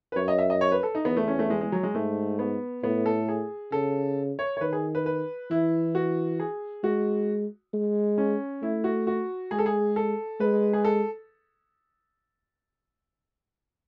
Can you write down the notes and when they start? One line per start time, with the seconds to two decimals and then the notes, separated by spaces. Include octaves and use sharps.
0.12 B4
0.16 F#2 C#5
0.28 D#5
0.38 E5
0.50 D#5
0.61 C#5
0.72 B4
0.83 A4
0.95 D#4
1.05 E2 B3
1.17 A3
1.28 C#4
1.39 A3
1.50 G#3
1.61 G#3
1.72 F#3
1.83 G#3
1.95 G#2 A3
2.39 B3
2.83 A2 B3
3.06 A4
3.28 G#4
3.72 C#3 A4
4.39 C#5
4.57 C#5
4.61 D#3 B4
4.73 G#4
4.95 B4
5.06 B4
5.51 E3 E4
5.95 F#4
6.40 G#4
6.83 G#3 F#4
7.73 G#3
8.18 C#4
8.62 A3 E4
8.84 F#4
9.07 F#4
9.51 G#3 G#4
9.59 A4
9.66 G#4
9.96 A4
10.40 G#3 B4
10.73 G#4
10.85 A4